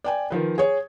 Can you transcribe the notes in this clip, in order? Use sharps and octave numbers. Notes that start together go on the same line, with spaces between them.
D5 G5 G#5
D#3 F3 B4
G#4 C#5